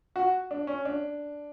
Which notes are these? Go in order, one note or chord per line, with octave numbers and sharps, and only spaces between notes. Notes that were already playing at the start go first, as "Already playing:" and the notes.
F#4
D4
C#4
D4